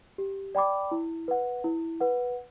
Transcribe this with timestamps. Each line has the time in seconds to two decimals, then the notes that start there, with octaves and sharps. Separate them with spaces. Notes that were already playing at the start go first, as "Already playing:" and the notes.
0.18 G4
0.55 D5 G5 B5 D6
0.91 E4
1.28 B4 F#5
1.64 E4
2.00 B4 F#5